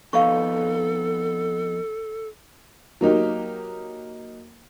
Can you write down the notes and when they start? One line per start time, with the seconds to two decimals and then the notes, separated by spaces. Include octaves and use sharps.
0.13 F2 B3 D#4 A4 F5 C#6
3.01 F#3 A#3 D#4 G4